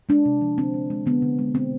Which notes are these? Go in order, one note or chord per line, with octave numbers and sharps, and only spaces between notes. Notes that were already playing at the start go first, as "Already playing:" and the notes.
G#3 D4
C3
F3
D3 C4
G#3
G#3
D3 B3
D3
G#3
B2 C4